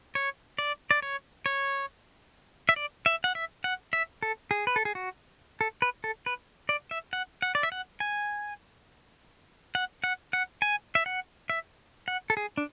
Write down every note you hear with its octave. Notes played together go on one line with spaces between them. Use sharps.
C#5
D5
D5
C#5
C#5
E5
D5
E5
F#5
E5
F#5
E5
A4
G#4
B4
A4
G#4
F#4
A4
B4
A4
B4
D5
E5
F#5
F#5
D5
E5
F#5
G#5
F#5
F#5
F#5
G#5
E5
F#5
E5
F#5
A4
G#4
D4